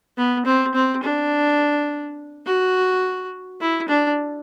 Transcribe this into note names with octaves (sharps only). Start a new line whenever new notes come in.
B3
C4
C4
D4
F#4
E4
D4